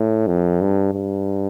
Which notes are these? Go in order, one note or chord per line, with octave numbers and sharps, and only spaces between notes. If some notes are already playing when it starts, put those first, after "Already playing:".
Already playing: A2
F2
G2
G2